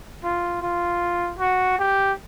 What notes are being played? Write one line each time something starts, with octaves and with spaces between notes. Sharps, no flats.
F4
F4
F#4
G4